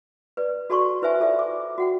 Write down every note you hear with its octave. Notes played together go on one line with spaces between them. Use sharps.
B4 D5
F#4 A4 D5 A5 C6 C#6
E4 B4 C5 E5 G#5 A5
F4 A4 D5 E5
D6
F#4 F#5 G5